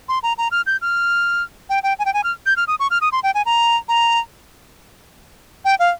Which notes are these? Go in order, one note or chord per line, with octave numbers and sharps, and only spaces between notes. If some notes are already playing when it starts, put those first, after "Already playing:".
C6
A#5
A#5
F6
G6
F6
G5
G5
G#5
G5
G#5
F6
G6
F6
D#6
C#6
F6
D#6
C6
G5
G#5
A#5
A#5
G5
F5